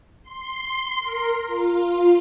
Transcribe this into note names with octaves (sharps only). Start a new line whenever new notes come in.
C6
A#4
F4